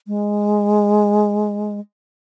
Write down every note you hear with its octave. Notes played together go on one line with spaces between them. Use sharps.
G#3